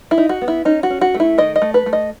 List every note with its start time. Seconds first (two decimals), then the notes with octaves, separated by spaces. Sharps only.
0.11 E4
0.18 D#4
0.29 F#4
0.41 B3
0.48 E4
0.65 C#4 D#4
0.83 F#4
0.90 C#4
1.01 F#4
1.14 A3
1.20 E4
1.38 D#3 D#5
1.56 D#5
1.62 A3
1.74 B4
1.86 A3
1.93 D#5